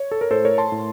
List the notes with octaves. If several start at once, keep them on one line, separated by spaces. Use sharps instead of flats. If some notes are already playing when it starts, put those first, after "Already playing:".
Already playing: C#5
A4
A#4
A2 A4 C5
A#4 C#5
A5 C6
A2